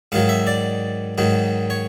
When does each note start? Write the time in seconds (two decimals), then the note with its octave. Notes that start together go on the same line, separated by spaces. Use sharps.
0.12 G#2 D#3 F#3 F5
0.29 E5
0.47 D5
1.18 G#2 D#3 F#3
1.70 C#5